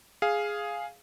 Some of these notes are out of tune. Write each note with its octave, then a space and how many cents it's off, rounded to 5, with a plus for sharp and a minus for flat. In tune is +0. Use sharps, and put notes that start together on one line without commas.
G#4 +0 F5 +0